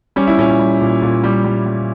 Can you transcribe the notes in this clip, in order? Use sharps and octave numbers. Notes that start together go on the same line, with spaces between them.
G3 C#4
E4
A#2 C#4
G3
A#2
A#2
G3
G3
G3